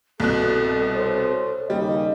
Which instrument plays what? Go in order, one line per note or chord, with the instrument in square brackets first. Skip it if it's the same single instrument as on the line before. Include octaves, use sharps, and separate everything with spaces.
[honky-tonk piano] C2 B2 F#6 [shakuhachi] A4
[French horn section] C5 C#5
[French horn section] D#2 C#3 D#5 [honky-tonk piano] G3